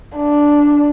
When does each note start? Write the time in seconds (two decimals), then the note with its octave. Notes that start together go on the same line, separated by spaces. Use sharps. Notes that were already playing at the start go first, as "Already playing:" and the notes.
0.16 D4